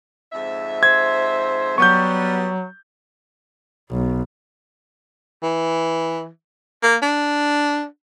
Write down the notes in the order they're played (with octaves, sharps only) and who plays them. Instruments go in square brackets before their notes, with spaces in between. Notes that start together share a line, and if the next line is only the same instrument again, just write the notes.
[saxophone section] F2 G#2 E5
[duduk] C5 [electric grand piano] G#6
[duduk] F#3 [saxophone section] G3 B3 [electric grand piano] C#6 G6
[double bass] B1
[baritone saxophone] E3
A#3
D4